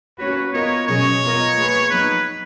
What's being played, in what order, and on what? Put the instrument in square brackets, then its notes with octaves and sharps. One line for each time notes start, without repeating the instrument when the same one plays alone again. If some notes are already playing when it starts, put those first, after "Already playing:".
[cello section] A#3 C#4 F#4 C#5 [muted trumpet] B4
[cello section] B3 F4 A#4 D#5 [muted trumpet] C#5
[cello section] B2 F#3 C#4 G#4 D#5 [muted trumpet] C#5
[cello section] F#3 B3 F4 A#4 D#5
A#3 F4 G#4 B4
[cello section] F#3 B3 D#4 [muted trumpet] B4